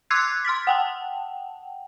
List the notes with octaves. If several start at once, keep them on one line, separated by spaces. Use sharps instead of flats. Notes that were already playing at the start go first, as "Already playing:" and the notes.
C6 D6 E6 F#6 G#6 C7
C6 F6 A6 B6
F#5 G5 A5